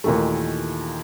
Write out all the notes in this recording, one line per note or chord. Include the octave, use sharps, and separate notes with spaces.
D#2 A#2 D#3 E3 A3